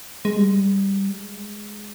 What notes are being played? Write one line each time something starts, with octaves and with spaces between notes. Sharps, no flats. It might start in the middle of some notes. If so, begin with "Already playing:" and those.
G#3
G3
G#3